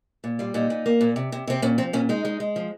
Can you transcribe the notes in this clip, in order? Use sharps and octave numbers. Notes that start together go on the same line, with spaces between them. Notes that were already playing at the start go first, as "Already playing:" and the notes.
A#2
G3 F4
A#2 D#4
A#2
A#3
A#2
C3
C3
C3 C4
A#2 C#4
F3 C4
A#2 C#4
G#3 D#4
G#3
G#3
F3